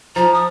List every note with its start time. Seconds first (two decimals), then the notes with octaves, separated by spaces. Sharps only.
0.16 F3 A#5
0.34 D#6